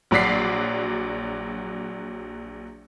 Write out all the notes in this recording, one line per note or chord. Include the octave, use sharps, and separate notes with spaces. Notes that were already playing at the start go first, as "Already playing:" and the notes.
A#1 F#3 F#4 D5 B6 C7